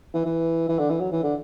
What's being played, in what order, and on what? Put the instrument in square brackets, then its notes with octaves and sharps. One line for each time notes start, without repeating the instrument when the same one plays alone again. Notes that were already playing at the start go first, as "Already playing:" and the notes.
[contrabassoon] E3
E3
E3
D3
E3
F#3
E3
D3